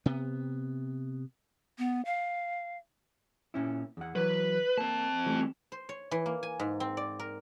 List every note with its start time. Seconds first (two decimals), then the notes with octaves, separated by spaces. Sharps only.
0.06 C3 B3
1.78 B3
2.05 F5
3.54 A#2 C#4 E4
3.97 E2 F#5
4.16 E3 F#3 B4
4.78 A#3 C4 A5
5.26 E3 G3 A3
5.72 C5
5.89 C#5
6.11 E3
6.26 A#3
6.43 G#5
6.60 G#2
6.80 C4
6.97 D5
7.20 A#4